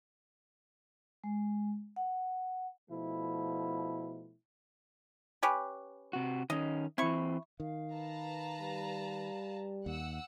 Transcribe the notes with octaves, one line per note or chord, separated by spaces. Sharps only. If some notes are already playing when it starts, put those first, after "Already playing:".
G#3
F#5
B2 F3 A3 E4
C#4 G4 B4
C3 F#4
D#3 C#4 D#5
E3 C4 E4 C#6
D#3 F5
B4 A5 A#5
G3
D#2 F#5 E6